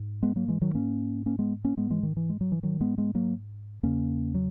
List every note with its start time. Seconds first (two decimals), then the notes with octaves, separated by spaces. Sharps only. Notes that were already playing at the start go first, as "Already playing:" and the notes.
Already playing: G#2
0.23 G#3 B3
0.36 F#3 A#3
0.48 E3 G#3
0.61 D#3 F#3
0.75 G#2 A#3 C#4
1.26 A#3 C#4
1.39 G#3 B3
1.64 A#3 C#4
1.77 G#2 G#3 B3
1.90 E3 G#3
2.03 D#3
2.17 E3
2.29 G#3
2.41 F#3
2.52 E3
2.63 D#3 F#3
2.80 G#2 G#3 B3
2.98 G#3 B3
3.15 F#3 A#3
3.83 E2 C#3 A#3 C#4
4.35 F#3